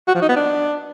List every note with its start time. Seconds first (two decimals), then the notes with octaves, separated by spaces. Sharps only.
0.08 F#4
0.15 F3
0.22 D#4
0.29 B3
0.36 D4